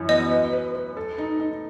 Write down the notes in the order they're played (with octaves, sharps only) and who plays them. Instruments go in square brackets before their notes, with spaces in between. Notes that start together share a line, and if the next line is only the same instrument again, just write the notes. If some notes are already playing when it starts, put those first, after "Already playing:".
Already playing: [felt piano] F#2 E3
[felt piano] B3 [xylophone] D#5
[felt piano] B4
B4
B4
A4
D#4
D#4